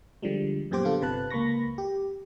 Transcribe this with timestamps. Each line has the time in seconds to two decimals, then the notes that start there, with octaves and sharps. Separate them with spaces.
0.22 D3 F3 G3 G#3
0.71 F#2 A#2 B3 G4 C5 D6
0.85 D3 B3 F4 G4 A4
1.01 G1 C3 B4 A5 F#6
1.30 C#2 A#3 B5 C#6 A#6
1.78 G4